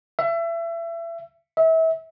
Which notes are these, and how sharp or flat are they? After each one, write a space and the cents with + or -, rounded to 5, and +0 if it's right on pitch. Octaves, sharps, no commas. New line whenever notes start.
E5 +30
E5 -30